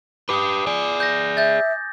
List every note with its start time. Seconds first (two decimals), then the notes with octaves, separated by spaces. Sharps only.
0.29 G4 B4 D6 D#6
0.67 G#4 D5 G#5
1.00 G6 A#6
1.37 E5 G6 A6